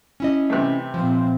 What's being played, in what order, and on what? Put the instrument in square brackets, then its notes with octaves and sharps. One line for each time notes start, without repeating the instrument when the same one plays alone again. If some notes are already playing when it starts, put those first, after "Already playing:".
[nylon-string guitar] C#4 E4 D#5
[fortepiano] C3 E3 A3
[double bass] A#2 C4 [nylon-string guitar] F3